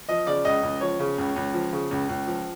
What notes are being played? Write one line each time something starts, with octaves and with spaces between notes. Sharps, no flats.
F3 D#5
C#3 D5
C#2 D#5
C#2
F3 C#5
C#3
C#2
C#2
F3
C#3
C#2
C#2
F3